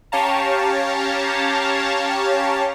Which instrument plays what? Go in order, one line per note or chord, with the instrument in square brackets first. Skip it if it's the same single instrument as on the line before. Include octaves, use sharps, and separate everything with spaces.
[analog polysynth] C#4 G4 C#5 F5 A5 A#5